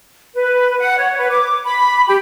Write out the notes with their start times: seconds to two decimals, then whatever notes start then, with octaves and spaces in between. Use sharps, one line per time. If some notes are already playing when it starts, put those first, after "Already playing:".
0.35 B4
0.79 F#5
0.97 C#5
1.18 B4
1.30 D6
1.64 B5
2.08 G4